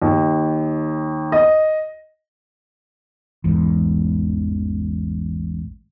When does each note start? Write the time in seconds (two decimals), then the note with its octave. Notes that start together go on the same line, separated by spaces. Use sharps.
0.02 D#2
1.32 D#5
3.44 A1 E2 G#2